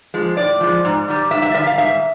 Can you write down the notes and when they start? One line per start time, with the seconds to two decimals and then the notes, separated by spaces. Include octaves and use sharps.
0.14 F3 G#3
0.37 A2 D5
0.60 F3 G#3
0.85 G#2
1.08 D#3 G3
1.31 G#2 E5
1.42 E5
1.54 D#3 G3 E5
1.67 F5
1.77 G#2 E5